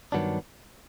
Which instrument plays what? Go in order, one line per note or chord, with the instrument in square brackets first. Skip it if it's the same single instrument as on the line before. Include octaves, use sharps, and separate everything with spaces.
[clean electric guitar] G2 D#3 F#3 B3 D4